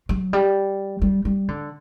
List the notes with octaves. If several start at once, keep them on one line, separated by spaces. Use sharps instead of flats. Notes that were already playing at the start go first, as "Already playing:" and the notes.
F#3
G3
G3
G3
D3